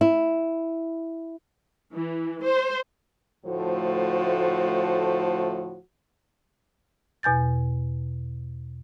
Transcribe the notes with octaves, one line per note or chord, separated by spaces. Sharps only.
E4
E3
C5
D2 A2 F3 A3 F#4 C5
E2 B2 G#5 G6 A6